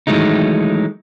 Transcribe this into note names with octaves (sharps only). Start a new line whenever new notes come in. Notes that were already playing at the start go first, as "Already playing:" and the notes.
D#3 E3 F#3 G#3 A3 D#4